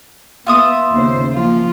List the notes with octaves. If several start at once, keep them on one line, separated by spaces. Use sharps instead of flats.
B3 F4 E5 D#6
D#2 C#3 C5
F3 A#3 F4